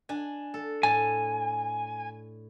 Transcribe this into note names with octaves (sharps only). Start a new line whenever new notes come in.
D4 G#5
A4
A2 G#5 A5